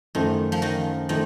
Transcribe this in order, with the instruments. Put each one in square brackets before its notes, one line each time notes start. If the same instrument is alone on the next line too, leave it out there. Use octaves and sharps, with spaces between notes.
[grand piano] F#2 F3 A3 [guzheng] D#3
[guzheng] F3
D#3
[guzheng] D#3 [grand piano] F3 A3